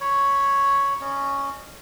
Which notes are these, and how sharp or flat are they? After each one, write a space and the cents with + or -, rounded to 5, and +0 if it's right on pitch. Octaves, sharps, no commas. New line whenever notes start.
C#5 +0 B5 -10
C#4 +0 D#5 -35